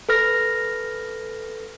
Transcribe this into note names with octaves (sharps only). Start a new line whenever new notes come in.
A4 B4 F6 A#6